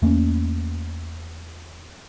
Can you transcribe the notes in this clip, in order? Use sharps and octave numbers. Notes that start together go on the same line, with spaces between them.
E2 A3 A#3 C#4